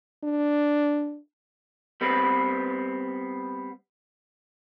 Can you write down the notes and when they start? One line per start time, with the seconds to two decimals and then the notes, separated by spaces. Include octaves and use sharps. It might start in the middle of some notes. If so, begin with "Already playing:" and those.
0.24 D4
2.01 G3 B3 C4 B4